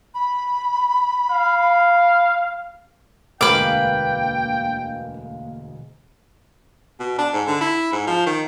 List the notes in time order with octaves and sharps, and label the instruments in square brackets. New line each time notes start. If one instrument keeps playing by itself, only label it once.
[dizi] B5
[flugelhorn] F5
[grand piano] E1 D2 G#3 [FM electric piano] A#3 F5 [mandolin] B4 D6 [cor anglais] G5
[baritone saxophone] B2
D4
G#2
D3
E4
G#2
F3
D#3